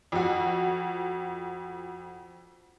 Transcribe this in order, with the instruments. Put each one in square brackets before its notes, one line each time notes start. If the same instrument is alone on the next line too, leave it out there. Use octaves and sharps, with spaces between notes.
[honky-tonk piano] F2 F#4